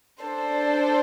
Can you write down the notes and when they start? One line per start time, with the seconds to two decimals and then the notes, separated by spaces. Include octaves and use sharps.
0.22 D4 A4 C5